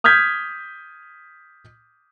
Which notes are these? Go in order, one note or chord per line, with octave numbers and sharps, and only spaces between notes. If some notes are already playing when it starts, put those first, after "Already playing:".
D#6 F6 G6 G#6 B6